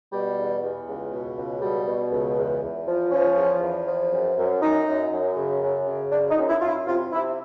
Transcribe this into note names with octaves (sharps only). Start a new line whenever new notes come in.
B2 G3
E2
E2
C#2
B2
C#2
B2 G3
B2
C#2
E2
E2
F3
F3 C#4
E2
E2
F3
F#2
F#2
F#2 D#4
F#2
F#2
C#3
F#2
C#3
F#2 D4
D#4
F#2
E4
F#2 F4
E4
C3 F4
C3 E4